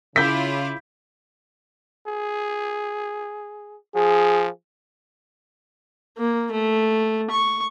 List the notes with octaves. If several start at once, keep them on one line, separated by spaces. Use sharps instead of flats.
C#3 E4 F4 D6 G6 B6
G#4
F3 G#4
A#3
A3
C#6